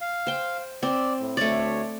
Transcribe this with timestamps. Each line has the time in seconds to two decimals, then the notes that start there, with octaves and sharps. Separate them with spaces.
0.01 F5
0.27 C5 G5
0.83 C4 D5
1.20 A2
1.37 D2 A3 C#5 D5